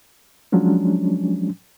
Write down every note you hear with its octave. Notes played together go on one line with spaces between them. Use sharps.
F3 F#3 G#3 C#4 D4